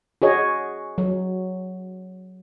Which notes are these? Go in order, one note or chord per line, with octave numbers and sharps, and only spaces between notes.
F#4 G#4 C#5 D#5
F#3